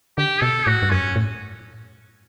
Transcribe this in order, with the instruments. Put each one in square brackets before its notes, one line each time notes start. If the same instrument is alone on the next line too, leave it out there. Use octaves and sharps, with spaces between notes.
[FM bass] D3 [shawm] G4
[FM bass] B2 [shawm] A4
[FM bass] A2 [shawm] F#4
[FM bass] G2
[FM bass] F#2 [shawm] C#4
[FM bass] A2